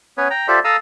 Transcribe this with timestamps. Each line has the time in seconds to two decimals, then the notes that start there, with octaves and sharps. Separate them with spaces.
0.18 B3 C#4 B4 C#5
0.31 G5 A#5
0.48 F4 G4 A4 C5 D5 E5
0.64 A4 F5 A#5 D#6 E6